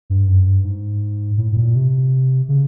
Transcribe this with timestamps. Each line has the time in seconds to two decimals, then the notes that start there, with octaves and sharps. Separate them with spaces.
0.10 G2
0.28 F#2
0.47 G2
0.65 G#2
1.37 A2
1.52 A2
1.57 A#2
1.75 C3
2.49 C#3